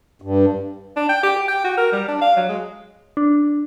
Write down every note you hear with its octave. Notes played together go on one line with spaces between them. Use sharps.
G2
D4
G5
G4
G4
G5
F#4
A#4
G3
D4
F5
F#3
G#3
D4